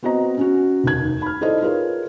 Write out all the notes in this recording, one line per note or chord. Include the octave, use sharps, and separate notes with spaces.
B3 C4 F#4 C5 D#5 A#5
C#4 F#4
F1 D#2 G#6
B5 F6
D#4 E4 A4 C5 D5 D#5
F4 G#4 A#4 B4 C#5